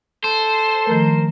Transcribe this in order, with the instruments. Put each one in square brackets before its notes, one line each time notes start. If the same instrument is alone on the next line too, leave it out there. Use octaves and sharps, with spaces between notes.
[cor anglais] A4 [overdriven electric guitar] C5
[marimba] D#3 F3 A3 [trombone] A#4